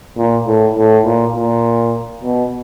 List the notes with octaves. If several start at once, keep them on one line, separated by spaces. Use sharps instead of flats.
A#2
A2
A2
A#2
A#2
B2